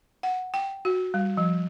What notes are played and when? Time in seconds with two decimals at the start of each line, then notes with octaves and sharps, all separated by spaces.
0.23 F#5
0.54 G5
0.85 F#4
1.14 G3
1.37 F3